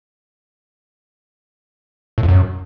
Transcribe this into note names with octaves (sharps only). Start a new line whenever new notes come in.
A2
F2
F#2